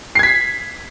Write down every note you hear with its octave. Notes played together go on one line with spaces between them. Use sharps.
G#6 B6 C7